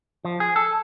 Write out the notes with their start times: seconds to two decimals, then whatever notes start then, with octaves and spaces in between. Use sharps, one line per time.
0.25 F3
0.40 G#4
0.56 A4